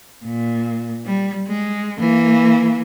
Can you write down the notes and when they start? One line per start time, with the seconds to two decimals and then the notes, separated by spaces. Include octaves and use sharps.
0.25 A#2
1.06 G3
1.47 G#3
1.99 E3 A#3